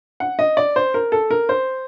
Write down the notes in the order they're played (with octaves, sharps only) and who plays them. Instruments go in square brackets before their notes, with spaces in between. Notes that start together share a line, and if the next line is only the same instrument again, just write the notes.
[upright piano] F#5
D#5
D5
C5
A#4
A4
A#4
C5